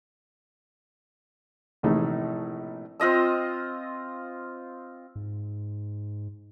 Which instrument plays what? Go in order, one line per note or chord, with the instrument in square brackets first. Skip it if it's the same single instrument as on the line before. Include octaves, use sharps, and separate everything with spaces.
[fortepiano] A#1 A2 C3 E3 A3 D#4
[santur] C4 F4 D#5 E6
[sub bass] G#2